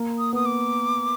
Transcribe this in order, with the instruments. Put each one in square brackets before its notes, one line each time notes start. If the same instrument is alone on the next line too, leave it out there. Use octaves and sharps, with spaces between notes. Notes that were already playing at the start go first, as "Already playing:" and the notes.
Already playing: [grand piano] A#3
[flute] D#6
[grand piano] B3 [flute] D#6
[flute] D6